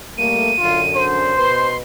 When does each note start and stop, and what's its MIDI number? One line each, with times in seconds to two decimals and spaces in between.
0.18 0.52 55
0.18 0.52 57
0.18 0.52 58
0.18 1.05 99
0.60 1.33 42
0.60 1.33 50
0.60 0.83 65
0.95 1.71 72
1.37 1.81 47
1.37 1.81 71
1.37 1.77 84